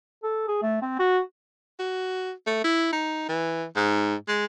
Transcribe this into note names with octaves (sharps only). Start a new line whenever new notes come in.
A4
G#4
A3
C4
F#4
F#4
A3
E4
D#4
E3
G#2
G#3